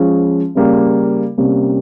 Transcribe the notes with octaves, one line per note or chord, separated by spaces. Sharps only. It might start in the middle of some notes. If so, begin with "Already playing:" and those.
Already playing: F3 G#3 C#4 F4
C#3 G3 A#3
C3 G3 A#3 C#4